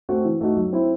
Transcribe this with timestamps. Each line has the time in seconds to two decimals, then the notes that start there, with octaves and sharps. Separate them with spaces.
0.09 A3 C4 F#4
0.25 E3
0.41 A3 D#4 F#4
0.57 F#3
0.73 C4 E4